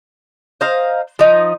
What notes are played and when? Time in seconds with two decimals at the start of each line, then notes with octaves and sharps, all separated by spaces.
0.61 C5 D#5 F5 A#5
1.19 F3 D#4